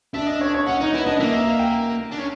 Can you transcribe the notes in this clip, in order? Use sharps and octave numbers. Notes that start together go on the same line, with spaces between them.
D4 E5
D#5
C#5
C#5
C#4 F#5
D#4 D#5
E4 B4
D4 D#5
A#3 E5
E5
F5
G5
D4
C#4